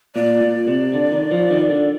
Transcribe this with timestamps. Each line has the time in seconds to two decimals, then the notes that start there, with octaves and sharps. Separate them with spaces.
0.15 A#2 D5
0.41 A#2
0.68 C3
0.94 D3
1.12 D#3
1.31 F3
1.51 D#3
1.70 D3